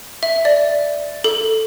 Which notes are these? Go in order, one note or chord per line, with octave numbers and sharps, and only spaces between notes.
E5
D5
A4